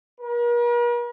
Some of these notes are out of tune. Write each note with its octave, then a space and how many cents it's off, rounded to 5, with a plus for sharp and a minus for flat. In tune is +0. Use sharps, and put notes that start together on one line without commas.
A#4 +45